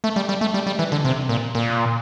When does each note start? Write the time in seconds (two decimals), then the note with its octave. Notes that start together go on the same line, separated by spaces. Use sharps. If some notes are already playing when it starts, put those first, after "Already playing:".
0.04 A3
0.16 G3
0.29 G3
0.41 A3
0.54 G3
0.67 G3
0.79 E3
0.92 D3
1.05 C3
1.29 A#2
1.55 A#2